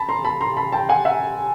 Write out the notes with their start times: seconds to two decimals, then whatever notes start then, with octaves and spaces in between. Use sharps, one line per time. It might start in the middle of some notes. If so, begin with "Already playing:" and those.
Already playing: A5 B5
0.09 A#5 C6
0.24 A5 B5
0.41 A#5 C6
0.57 A5 B5
0.72 G5 A5
0.89 F#5 G#5
1.05 E5 F#5